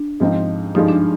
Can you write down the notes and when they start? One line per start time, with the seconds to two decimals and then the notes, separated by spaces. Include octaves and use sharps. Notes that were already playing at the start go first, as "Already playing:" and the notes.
Already playing: D4
0.20 G#2 F3 C4 D#4
0.75 G2 F3 G#3 D#4
0.89 D4